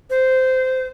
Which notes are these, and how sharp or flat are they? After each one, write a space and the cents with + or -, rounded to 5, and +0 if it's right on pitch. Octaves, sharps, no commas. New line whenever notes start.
C5 -15